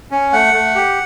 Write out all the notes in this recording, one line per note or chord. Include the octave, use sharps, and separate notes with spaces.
C#4
A3 F#5
A3
G4